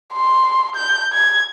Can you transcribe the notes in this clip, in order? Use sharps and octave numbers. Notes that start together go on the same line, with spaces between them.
C6
G6
G#6